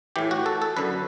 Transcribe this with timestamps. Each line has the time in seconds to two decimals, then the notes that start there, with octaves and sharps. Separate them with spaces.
0.16 A2 E3 G4
0.31 F#4
0.46 A4
0.62 A4
0.77 F#2 D3 B4